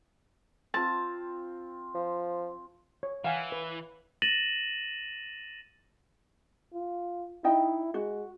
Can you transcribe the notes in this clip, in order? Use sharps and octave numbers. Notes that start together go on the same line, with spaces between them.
C4 F4 A5
F3
C#5
E3 F5 F#5 G#5
B4
A6 A#6 D#7 E7 F#7
F4
D#4 E4 D#5 G5
G#3 F#4